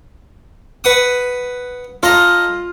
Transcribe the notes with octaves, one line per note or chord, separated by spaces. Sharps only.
B4 F#5 D#6
F4 A4 D#5 A#5